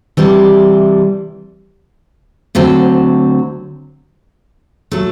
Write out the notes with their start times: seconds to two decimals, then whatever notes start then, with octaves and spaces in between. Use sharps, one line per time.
0.17 C3 E3 G3 D4
2.55 D2 D3 F#3 C4
4.91 F#3 A3